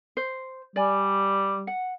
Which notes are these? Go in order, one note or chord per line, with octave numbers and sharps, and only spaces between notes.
C5
G3 D5 G#5
F#5